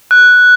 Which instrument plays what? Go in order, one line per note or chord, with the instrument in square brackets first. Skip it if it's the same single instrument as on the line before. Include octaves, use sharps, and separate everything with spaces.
[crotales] F#6